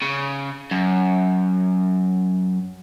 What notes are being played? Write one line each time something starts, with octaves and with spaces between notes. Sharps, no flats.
C#3
F#2